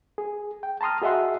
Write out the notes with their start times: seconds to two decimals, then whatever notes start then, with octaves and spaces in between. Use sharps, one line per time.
0.18 G#4
0.63 G5
0.81 A5 A#5 C6 D#6 F6
1.02 F#4 G#4 D#5 E5 F#5 C6